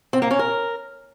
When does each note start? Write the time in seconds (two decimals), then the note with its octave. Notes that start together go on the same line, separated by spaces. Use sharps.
0.13 C4
0.22 A#3
0.31 C#4
0.39 A#4